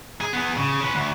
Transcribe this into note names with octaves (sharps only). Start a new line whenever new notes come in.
G#4
B3 G#4
C#3
C#4 B4
D2